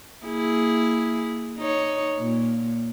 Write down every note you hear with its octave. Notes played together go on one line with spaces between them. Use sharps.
A#3 E4 G#4
D#4 C#5
A#2